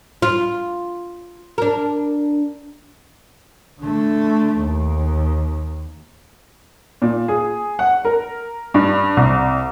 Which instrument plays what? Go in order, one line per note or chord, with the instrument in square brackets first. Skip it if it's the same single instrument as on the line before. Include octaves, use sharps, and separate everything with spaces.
[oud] F4
D4 A#4
[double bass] D3 A3
D#2
[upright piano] A#2
G#4
F#5
A#4
G2
C2